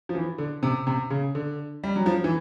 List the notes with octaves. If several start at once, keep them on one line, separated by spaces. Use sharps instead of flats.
F3
E3
D3
C3
C3
C#3
D3
G3
F#3
F3
E3